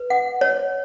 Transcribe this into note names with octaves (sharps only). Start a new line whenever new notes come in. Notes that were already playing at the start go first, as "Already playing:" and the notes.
Already playing: B4
F#5
C#5